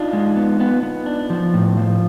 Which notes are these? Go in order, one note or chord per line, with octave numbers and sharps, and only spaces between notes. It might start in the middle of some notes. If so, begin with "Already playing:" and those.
Already playing: D4 D#4 F4
G#3
B3
B3
B3
D4
F3
A2
F3